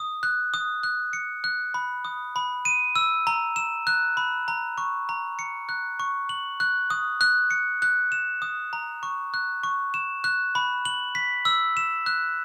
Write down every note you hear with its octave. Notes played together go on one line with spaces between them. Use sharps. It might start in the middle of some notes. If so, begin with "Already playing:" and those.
Already playing: D#6
F#6
D#6
F#6
C#7
F#6
B5
D#6
B5
D#7
E6
A#5
E7
F#6
B5
A#5
C#6
A#5
C#7
F#6
C#6
F#7
F#6
D#6
F#6
C#7
F#6
E7
D#6
A#5
C#6
F#6
C#6
E7
F#6
B5
F#7
B6
E6
E7
F#6